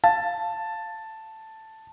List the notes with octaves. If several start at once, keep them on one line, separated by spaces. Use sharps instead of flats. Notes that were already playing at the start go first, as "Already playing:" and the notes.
F5 A5